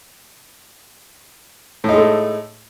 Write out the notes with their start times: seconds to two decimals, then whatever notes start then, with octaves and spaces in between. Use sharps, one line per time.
1.84 A2
1.89 D#4
1.93 G#3
1.98 A3